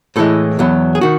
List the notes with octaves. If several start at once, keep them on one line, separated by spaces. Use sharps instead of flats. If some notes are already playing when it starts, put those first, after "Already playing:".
A2 E3 G#3 A4
E2 B2 F#3
G#4
D#3 F#4